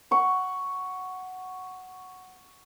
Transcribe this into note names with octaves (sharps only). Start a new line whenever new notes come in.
F#5 C#6